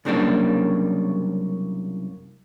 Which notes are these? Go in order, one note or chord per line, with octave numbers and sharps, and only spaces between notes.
C2 F#2 C#3 G3 A#3 D4